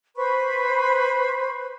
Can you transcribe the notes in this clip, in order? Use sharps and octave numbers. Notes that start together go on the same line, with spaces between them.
B4 C5 B5 C#6